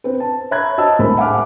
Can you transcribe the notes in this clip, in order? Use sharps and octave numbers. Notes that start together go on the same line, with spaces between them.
C4 B4
A5
C#5 E5 A#5 B5 F#6 G#6
F#4 C5 D#5 A5 E6
C2 A2 G#3 A#4 C5 B5
E5 F#5 G#5 D6 F6